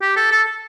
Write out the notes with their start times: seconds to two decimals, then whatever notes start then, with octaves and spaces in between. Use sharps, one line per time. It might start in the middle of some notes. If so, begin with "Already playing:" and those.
0.02 G4
0.16 A4
0.31 A4